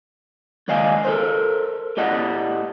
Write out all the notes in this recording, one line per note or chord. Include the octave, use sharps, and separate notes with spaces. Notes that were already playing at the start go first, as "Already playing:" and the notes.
C#2 D#3 D5 D#5 F5 G#5
A4 A#4 C5
A2 G4 D5 D#5 F#5